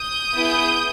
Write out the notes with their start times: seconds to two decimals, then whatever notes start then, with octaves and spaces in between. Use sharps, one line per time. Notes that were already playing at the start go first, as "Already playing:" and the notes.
Already playing: D#6 G6
0.34 B3 E4 G#4